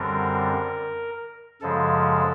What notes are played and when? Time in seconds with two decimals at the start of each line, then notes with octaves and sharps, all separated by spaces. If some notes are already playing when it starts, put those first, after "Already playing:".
Already playing: F#2 D3 G3 C4 A#4
1.61 F#2 C#3 F3 G#3 A4